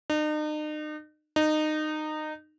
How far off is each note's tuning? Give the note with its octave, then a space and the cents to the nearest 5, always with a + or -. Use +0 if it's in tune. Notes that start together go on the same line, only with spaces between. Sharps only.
D#4 -40
D#4 -20